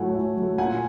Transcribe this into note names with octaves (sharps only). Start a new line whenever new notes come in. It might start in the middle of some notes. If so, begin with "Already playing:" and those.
Already playing: A2 F#3 A3 F#5 G#5
A2
F#3 A3
A#2 F#5 G#5